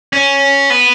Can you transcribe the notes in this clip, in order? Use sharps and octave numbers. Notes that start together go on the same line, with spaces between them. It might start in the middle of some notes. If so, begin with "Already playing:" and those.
C#4
B3